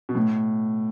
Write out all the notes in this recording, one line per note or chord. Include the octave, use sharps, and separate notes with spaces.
B2
A2